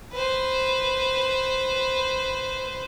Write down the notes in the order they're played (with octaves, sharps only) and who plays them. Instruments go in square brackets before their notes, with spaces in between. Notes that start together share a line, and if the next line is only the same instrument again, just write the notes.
[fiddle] B4 C5